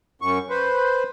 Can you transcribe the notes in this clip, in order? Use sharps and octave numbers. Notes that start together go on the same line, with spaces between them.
F#2 C#6
B4 C5